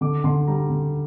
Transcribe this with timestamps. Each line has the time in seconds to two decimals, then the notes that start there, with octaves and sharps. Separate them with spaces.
0.01 D3 D6
0.24 D3 C6
0.48 G3 A#5
0.70 D3